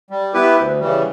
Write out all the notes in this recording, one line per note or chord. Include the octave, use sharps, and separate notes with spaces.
G3
B3 E4 G4 B4
D2
C#3 E3 G3